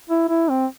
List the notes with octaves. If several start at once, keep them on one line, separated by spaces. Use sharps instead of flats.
E4
E4
C4